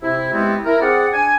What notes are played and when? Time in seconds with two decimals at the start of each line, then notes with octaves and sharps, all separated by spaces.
0.03 C3 E4
0.33 G3 G#3 B3 C4 E4
0.66 E4 A#4
0.81 C4 G#4 D5 F#5
1.13 D4 G#5